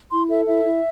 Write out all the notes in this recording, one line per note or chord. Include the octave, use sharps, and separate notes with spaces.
E4 C6
A4 E5
E4 E5
E4